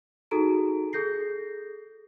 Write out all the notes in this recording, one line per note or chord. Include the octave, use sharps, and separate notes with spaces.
D#4 F#4 G#4 A4 A#5 D7
G#4 A4 G6 A#6 C7